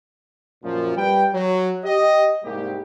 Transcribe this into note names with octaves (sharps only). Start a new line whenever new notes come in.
F#2 A#2 F3
G3 B4 G5
F#3
G4 D#5
C2 G#2 G3 A#3 G4